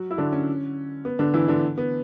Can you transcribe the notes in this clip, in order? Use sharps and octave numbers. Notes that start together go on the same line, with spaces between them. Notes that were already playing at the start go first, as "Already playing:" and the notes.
Already playing: F#3 F#4
E4
D3 D4
C#4
B3
D3 D4
E3 E4
D3 D4
B3